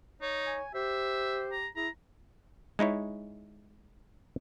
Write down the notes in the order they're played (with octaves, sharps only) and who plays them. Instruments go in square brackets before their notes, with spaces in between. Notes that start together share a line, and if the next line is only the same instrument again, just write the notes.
[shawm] D#4 [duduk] C#5
[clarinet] G#5
[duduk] G4 [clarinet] C5 [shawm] E5
[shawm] A#5
[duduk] E4 [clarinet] G#4 [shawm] A#5
[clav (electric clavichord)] G#3 D#4 E4 C#5